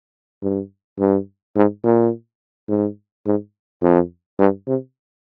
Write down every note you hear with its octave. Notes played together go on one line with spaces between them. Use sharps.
G2
G2
G#2
A#2
G#2
G#2
F2
G2
C3